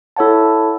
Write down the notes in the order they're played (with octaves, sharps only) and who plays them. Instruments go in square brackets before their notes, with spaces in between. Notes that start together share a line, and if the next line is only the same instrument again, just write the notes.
[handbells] E4 A4 C#5 F#5 A5